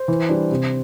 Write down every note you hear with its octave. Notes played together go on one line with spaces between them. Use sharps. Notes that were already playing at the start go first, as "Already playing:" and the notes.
Already playing: C5
E3
G3 D4
C3